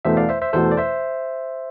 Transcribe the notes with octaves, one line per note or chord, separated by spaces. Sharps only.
E2 B2 A3 C5 E5
D5 F5
C5 E5
C5 E5
E2 B2 A3 A4 C5
D5
C5 E5